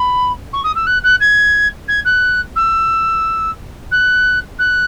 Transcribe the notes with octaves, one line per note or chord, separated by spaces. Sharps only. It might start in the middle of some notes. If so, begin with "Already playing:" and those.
Already playing: B5
C#6
D#6
E6
F#6
F#6
G#6
G#6
F#6
E6
F#6
F#6